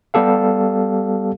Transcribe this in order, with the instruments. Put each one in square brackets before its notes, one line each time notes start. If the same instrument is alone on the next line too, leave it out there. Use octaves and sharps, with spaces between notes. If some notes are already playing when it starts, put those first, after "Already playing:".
[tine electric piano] G3 B3 G4 A4 F5